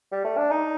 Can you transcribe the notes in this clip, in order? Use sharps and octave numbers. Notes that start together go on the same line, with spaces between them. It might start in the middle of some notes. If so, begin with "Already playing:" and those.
G3
A3
D4
D#4